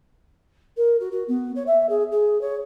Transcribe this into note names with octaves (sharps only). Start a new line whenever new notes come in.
A#4
F#4
F#4
B3
C#5
E5
G#4
G#4
C#5